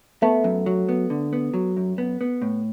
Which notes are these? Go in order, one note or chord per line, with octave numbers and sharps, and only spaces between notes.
A3 B3
F#2
F#3
B3
D3
B3
F#3
F#2
B3
B3
A2